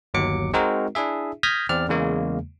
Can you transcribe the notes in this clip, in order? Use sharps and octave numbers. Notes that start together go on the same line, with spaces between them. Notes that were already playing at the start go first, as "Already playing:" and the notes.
G1 D#2 F#3 D6 C#7
G#3 C4 D#4 F#4 A#4
D4 E4 G#4 E5
D#6 F6 G6 G#6 A#6 B6
E2 C4 D5 F6
E2 C#3 G#3 A#3